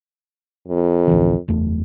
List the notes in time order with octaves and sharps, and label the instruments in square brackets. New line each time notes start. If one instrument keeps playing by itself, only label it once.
[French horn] F2
[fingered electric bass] A1 D2 E3
F#1 E2 A3